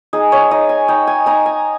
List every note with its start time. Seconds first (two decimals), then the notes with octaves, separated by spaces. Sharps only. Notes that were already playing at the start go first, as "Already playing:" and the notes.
0.13 D#4 G#4
0.32 C#5
0.51 D#4 D#5
0.69 G#5
0.88 D#4 G5
1.07 G#5
1.26 D#4 A#5
1.46 G#5